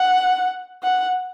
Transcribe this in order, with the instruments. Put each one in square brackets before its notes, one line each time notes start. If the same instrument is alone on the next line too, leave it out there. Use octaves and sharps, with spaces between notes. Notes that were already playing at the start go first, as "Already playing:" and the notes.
Already playing: [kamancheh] F#5
F#5